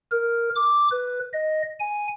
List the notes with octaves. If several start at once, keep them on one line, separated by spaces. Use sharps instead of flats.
A#4
D6
B4
D#5
G#5